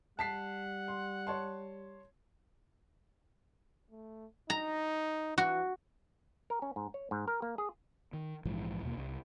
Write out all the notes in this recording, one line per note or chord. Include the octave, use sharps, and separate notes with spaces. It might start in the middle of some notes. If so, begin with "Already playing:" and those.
G3 F#5 A5 B6 C7
C6
C#5 A5 C6
A3
D#4 A#5
E3 F#4
A#4
C#4
G#2
C#5
G#2
A#4
A#3
G#4
D#3
A#1 G#2 E3 F3
D#2 B2 A#3
C2